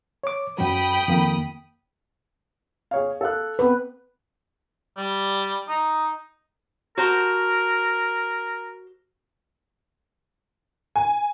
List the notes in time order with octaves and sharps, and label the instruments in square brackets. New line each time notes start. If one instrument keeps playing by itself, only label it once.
[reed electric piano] C#5 D6
[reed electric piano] F#2 F#3 [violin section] G5 B5 D#6
[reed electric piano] F2 D#3 A#3
[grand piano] G#4 C#5 F5
A4 F5 F#6
[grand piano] B3 C4 [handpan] B4
[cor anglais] G3
D#4
[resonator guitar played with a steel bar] F#4 C5 A5 [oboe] A#4
[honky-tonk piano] G#5